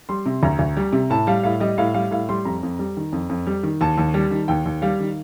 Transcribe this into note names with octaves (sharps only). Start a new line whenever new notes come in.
G3 C6
C3
D2 A#5
D2
G3
C3
A2 A5
G3 F5
A2 F5
G3 D#5
A2 F5
G3 F5
A2 F5
G3 C6
F2 A#5
F2
G3
D#3
F2
F2
G3
D#3
D#2 A5
D#2
G3
D#3
D#2 G5
D#2
G3 F5
D#3